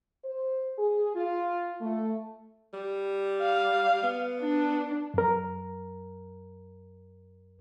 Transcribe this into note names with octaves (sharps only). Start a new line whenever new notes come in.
C5
G#4
F4
A3
G3
F5
B3
D4
F#2 A#4